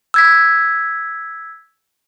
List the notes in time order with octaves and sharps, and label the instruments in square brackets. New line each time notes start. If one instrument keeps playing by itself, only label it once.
[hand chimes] E6 G#6 B6